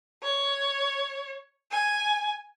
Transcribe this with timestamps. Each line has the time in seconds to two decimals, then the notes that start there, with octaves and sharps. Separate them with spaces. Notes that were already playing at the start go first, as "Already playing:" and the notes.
0.23 C#5
1.71 G#5